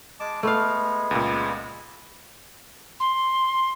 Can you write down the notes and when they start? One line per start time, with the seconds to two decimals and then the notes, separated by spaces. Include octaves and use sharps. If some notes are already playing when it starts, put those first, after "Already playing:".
0.20 G#3 A5 D6
0.43 G#3 A3 B3 F5
1.11 C#2 A#2
3.00 C6